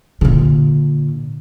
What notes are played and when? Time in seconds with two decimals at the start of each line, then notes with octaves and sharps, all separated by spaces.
0.21 A#2 D3